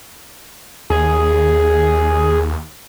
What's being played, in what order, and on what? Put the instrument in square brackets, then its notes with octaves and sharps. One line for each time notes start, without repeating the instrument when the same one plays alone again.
[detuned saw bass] D#2 [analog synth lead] G#4